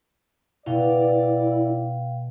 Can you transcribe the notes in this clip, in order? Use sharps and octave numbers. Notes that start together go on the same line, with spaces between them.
B2 E4 D5 F5 G5